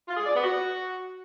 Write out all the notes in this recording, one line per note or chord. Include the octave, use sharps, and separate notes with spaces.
F4
G#4
D5
B3
F#4